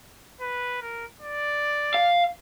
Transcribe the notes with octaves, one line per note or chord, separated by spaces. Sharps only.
B4
A#4
D5
F5